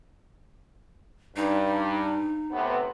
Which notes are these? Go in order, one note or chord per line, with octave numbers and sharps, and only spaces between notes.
G2 D#4
A2 C3 B3